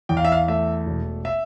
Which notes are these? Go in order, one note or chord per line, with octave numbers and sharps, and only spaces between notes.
E2 G5
F5
E5
F5
A3 E5
E1
E5